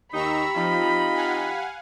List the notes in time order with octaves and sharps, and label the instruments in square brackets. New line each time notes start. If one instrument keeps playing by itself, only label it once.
[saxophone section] D#2 D#4 [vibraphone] G4 G5 [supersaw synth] A#5 C#6 E6 [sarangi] B5
[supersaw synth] F3 [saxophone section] C4 D#4 F4
[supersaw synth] F5 F#5 G#5